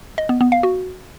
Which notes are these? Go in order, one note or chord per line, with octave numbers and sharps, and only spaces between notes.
D#5
B3
B3
F5
F#4